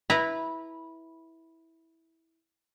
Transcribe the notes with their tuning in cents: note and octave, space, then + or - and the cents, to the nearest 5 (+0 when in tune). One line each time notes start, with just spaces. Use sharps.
E4 -10 B4 -15 A#5 +0